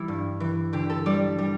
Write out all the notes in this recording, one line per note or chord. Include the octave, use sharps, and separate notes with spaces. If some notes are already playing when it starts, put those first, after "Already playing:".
Already playing: E3 G3 E4
G2
E3
D3 G4
A4
G3 D5
G3